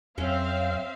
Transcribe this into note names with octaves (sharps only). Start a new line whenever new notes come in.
F2 F#3 C4 C#4 E5 F5